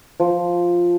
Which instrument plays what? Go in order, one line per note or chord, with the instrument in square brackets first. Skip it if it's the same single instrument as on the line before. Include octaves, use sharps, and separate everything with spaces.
[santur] F3